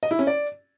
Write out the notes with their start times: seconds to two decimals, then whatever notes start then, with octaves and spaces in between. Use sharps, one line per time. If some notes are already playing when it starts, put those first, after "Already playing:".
0.03 D#5
0.11 E4
0.19 C#4
0.27 D5